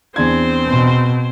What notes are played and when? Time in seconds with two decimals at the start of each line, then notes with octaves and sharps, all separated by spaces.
0.16 E2 C4 D4 C5 G#6
0.67 B2